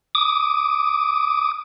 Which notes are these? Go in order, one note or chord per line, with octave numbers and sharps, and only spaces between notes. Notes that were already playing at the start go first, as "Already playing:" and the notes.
D6 D#6